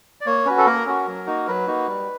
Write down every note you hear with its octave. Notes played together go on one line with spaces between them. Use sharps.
D5
A#3 C#5
C#4 F#4 B4
A4
A#3 A#4
C#4 F#4
F#3
A#3 D#4 F#4
F#3 B4
A#3 D#4 F#4
G3